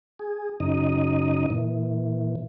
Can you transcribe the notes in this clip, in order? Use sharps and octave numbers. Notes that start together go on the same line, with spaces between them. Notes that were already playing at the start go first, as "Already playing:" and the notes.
G#4
F#2 C#3 D#4 D#5
A#2 E3